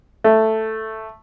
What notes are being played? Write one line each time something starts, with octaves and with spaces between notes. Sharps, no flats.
A3